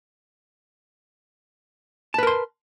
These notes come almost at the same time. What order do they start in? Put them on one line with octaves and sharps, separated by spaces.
A5 B4 A#4 C6